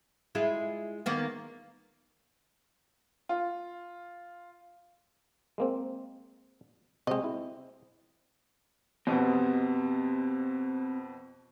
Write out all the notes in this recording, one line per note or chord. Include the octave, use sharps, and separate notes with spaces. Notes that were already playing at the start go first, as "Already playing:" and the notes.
G#3 E4 F4
D#3 A#3 B3
F4
G#3 A#3 C4
C3 G#3 C4 D#5
E4
F2 B2 B3 C4 G4 D#5